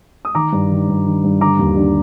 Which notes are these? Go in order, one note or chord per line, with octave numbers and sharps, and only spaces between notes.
D#6
D#3 A#5 D6
G2
D#3
G2
D#3
G2
D3 A#5 D6
D#2
D3